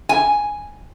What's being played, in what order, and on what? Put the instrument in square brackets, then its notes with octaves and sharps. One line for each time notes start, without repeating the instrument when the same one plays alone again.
[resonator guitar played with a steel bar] G#5